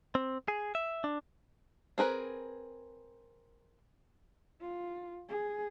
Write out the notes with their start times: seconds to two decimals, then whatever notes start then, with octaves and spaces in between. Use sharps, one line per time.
0.15 C4
0.48 G#4
0.75 E5
1.04 D4
1.98 C4 G#4 A#4 B4
4.61 F4
5.29 G#4